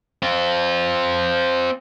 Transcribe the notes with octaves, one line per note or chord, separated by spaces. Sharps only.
C4 F4